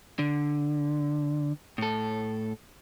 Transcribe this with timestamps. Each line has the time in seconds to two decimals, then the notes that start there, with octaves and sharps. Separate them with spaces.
0.19 D3
1.78 A2 A4